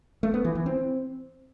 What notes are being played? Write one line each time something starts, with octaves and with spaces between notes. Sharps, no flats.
A3
B3
E3
E3
C4